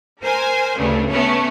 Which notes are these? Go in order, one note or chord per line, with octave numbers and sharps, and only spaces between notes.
A#4 C5 G#5
D2 G2 C#3 A3
A3 B3 C#4 C#5